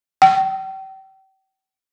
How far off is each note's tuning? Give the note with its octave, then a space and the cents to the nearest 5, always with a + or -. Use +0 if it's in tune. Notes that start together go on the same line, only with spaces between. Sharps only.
G5 -35